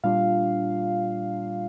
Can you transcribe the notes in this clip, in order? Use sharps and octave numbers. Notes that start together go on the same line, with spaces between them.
A#2 G3 D4 F4 F5